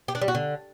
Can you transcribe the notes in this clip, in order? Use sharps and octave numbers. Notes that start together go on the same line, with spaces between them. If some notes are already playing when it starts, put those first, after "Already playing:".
G4
D4
G3
F#4
D3